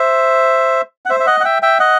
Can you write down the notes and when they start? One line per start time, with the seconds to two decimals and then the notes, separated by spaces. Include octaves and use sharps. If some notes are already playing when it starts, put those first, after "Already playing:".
Already playing: C5 E5
1.06 F#5
1.09 C5 E5
1.20 E5
1.27 D#5 F#5
1.40 F#5
1.45 E5 G5
1.62 E5 G5
1.80 D#5 F#5